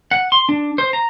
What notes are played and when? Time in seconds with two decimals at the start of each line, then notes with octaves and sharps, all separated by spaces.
0.11 F#5
0.32 C6
0.49 D4
0.78 C5
0.93 A#5